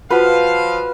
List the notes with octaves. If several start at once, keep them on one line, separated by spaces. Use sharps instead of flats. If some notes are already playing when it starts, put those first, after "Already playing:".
F3 F4 F#4 B4 F5 F#5